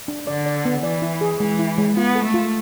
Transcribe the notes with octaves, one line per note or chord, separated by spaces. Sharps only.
D4
D3 D5
D5
B3
E3 D5
E4
G#4
E3 G#3
E4
G#3
B3 F4
A4
A3
F4